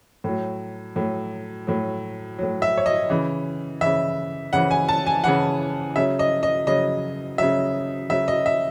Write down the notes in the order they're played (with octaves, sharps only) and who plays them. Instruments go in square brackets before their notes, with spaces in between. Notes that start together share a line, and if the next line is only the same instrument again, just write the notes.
[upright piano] A2 F#3
A2 F#3
A2 F#3
A2 F#3
E5
C#5
D#5
C#3 E3
C#3 E3 E5
C#3 E3 F#5
G#5
A5
G#5
C#3 E3 F#5
C#3 F#3 E5
D#5
D#5
C#3 F#3 D#5
C#3 F#3 E5
C#3 F#3 E5
D#5
E5